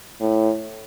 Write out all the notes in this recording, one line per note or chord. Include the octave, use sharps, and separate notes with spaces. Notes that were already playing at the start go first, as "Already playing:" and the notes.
A2